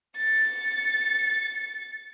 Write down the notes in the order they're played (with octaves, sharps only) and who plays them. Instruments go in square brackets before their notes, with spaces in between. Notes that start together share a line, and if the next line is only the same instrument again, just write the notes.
[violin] A6 C#7